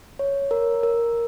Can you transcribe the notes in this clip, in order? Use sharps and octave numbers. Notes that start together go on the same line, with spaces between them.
C#5
A#4
A#4